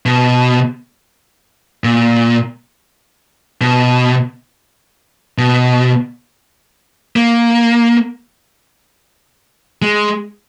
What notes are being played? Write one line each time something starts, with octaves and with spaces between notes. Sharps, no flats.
B2
A#2
B2
B2
A#3
G#3